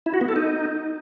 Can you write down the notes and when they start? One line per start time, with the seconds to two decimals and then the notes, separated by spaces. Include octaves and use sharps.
0.06 E4
0.14 F#4
0.21 B3
0.29 A4
0.36 D#4